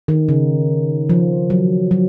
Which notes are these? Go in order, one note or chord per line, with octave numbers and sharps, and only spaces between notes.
D#3
C#3
F3
F#3
F#3